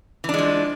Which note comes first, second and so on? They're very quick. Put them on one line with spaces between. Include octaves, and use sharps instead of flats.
E3 D4 G#3 F3